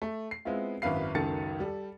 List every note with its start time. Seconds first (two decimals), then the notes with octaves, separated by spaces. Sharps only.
0.02 A3
0.31 C7
0.45 G#3 B3 C4 E4 F4
0.82 G#1 F#2 E4 B4 F5 C7
1.14 C#2 F#2 D#3 A4 A6 C#7
1.60 G3 A4